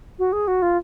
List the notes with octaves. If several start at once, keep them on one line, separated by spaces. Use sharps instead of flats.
F#4
G#4
F#4
F4